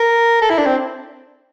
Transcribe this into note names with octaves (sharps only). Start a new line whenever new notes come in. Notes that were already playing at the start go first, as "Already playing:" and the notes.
Already playing: A#4
A4
E4
D4
C4